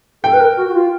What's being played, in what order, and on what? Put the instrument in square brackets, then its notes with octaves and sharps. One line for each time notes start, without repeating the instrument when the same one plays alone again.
[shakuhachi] A4 [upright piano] G5
[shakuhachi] B4
A#4
F#4
F#4
F4